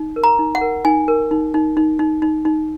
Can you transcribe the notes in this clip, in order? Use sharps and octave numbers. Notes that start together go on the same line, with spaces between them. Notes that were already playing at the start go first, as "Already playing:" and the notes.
Already playing: D#4
A#4
A#5
D#4
F#5
A#4
D#4 G#5
A#4
D#4
D#4
D#4
D#4
D#4
D#4